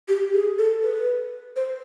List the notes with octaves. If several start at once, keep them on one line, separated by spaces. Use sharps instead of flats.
G4
G#4
A4
B4
C5